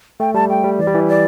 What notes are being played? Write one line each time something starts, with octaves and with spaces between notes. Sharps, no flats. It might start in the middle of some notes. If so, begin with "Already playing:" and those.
A3 G5
G3 A5
A3 G5
G3
E3 D5
G3
E3
D5